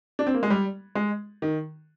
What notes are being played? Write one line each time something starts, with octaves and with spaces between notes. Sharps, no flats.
D4
C4
A#3
G#3
G3
G#3
D#3